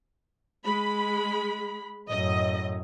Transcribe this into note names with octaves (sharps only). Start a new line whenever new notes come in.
G#3 B5
F#2 A2 D#5